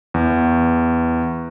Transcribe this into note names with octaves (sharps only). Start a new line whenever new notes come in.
E2